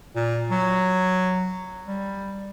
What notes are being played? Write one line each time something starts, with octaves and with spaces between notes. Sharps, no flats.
A#2
F#3
G3